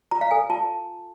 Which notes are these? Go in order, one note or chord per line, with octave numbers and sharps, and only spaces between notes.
F4 A#5
F5
A4 G#5
F4 A5